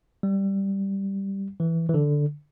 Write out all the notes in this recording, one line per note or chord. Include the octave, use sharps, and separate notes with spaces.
G3
E3
E3
D3